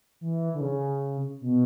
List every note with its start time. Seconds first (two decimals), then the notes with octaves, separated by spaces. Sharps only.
0.21 E3
0.54 D3
0.61 C#3
1.41 B2